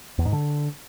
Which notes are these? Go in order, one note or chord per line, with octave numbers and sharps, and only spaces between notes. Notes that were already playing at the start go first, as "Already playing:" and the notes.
E2
G#2
D3